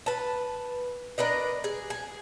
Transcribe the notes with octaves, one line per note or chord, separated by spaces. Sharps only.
B4 A5
D4 A#4 B4 D#5
G#4
G#4